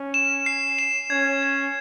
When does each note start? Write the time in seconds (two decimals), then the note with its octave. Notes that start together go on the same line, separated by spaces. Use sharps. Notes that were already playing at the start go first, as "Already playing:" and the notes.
Already playing: C#4
0.14 E7
0.46 C7
0.79 E7
1.10 C#4 G#6
1.43 G#6